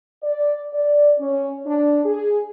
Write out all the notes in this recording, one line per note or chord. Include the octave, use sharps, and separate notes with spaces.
D5
D5
C#4
D4
G#4